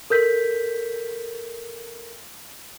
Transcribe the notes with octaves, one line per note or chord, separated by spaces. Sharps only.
A4 A#4 G6 B6